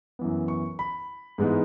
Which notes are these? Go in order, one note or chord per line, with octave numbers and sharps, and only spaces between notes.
F#2 E3 B3
C#6
B5
G#2 E3 G#3 B3 D#4